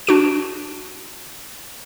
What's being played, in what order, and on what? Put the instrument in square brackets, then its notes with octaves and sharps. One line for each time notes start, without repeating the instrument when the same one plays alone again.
[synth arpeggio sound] D4 F#4 D7